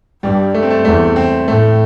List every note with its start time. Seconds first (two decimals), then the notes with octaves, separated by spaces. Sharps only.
0.22 G2 G3
0.54 A3
0.63 C4
0.70 A3
0.85 E2 A3
1.16 C4
1.48 A2 A3